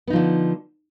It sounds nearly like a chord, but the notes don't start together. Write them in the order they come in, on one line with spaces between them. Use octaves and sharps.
B3 D#4 F3 D3